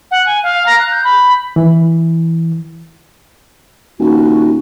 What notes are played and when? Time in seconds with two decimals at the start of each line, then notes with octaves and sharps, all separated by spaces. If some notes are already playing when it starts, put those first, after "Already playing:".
0.11 F#5
0.26 G#5
0.43 F5
0.66 A#5
0.79 F#6
0.91 G6
1.04 B5
1.56 E3
4.00 D#1 F#4